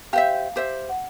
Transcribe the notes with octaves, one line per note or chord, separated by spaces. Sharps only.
G4 C5 E5 F5
G4 C5 E5
F#5